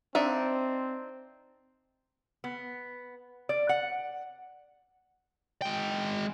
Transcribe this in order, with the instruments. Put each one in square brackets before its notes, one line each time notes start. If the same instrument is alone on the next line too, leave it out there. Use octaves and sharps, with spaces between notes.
[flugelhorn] C4 [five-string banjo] D4 D#4 E5
[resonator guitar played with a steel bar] B3
D5
F#5
[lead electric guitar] G#3 G5